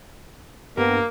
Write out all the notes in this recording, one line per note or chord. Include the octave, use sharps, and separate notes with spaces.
G2 A#3 B3 A#4